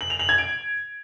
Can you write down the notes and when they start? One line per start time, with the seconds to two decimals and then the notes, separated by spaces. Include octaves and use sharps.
0.01 F#7
0.10 F7
0.19 F#7
0.29 G#6
0.38 D7